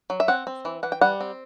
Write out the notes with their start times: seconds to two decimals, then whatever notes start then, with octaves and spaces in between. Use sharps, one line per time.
0.10 F#3
0.20 E5
0.28 C4 F#5
0.47 C4
0.65 E3
0.83 E3 F#5
0.92 G5
1.01 G3 F#5
1.21 C4